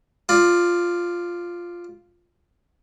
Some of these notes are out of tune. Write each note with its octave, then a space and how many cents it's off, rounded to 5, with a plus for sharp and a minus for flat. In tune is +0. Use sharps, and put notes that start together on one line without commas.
F4 +0 D5 +15